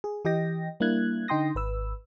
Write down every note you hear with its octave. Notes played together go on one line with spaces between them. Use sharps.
G#4
E3 G4 D#5 G5 A#6
G3 A#3 D4 E4 F#6 G#6
D3 D#4 G5 C6 D#6 A#6
G#1 B4 E6